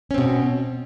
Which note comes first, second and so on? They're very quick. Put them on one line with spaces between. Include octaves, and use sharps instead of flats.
C#4 C4 B2